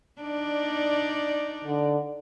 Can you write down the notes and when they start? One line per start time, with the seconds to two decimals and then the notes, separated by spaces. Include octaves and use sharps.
0.21 D4 D#4 D5
1.65 D3